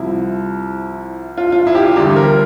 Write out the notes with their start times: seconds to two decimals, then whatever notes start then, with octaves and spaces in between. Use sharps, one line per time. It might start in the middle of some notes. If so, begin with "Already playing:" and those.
Already playing: C2 C3 F3 E4
1.37 F4
1.52 F4
1.67 E4
1.75 G4
1.81 F4
1.96 E2 D3 G3 G4
2.16 A#4